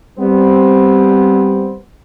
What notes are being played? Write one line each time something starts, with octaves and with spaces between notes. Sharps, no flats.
G3 B3 C4